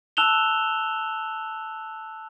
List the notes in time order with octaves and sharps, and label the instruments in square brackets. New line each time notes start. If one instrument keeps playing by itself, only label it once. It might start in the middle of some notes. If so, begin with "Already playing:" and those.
[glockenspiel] A5 E6 F#6 E7 F7 G7